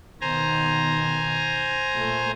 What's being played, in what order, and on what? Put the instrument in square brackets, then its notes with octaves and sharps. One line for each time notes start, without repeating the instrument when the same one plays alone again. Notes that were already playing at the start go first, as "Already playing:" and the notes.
[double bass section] B2 D#3 [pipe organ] C5 G#5 A#5
[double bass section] A#2 A3